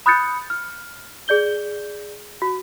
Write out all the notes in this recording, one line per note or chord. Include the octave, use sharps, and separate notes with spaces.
B5 D#6 F#6 G6 A6 C#7
F6
G#4 D5 G6 G7
F#4